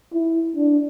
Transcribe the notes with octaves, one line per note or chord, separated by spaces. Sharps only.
E4
D4